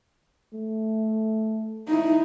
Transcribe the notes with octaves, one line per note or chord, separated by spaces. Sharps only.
A3
D#4 E4